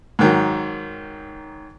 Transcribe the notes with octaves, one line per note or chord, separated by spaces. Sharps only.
G#2 D#3 F#3